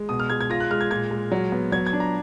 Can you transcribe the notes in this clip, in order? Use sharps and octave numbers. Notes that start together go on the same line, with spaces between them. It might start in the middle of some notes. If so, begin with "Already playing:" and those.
Already playing: G#3
B2 D#6
F6
G#3 G#6
G#6
F4 A#6
F#6
G#3 F6
G#6
A#2 G#6
G#3
F#3
B3
F#3 G#6
G#6
D4
A#5